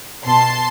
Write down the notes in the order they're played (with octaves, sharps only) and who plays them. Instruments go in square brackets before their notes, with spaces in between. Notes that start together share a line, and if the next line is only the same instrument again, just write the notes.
[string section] B2 A5 C6